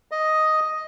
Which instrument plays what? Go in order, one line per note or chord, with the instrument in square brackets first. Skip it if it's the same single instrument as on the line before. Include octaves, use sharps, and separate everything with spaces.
[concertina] D#5